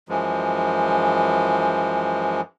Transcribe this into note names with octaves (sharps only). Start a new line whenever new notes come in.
F#2 E3 F3 G#3